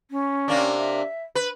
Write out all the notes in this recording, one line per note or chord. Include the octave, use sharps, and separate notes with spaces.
C#4
C3 A#3 D4
E5
B4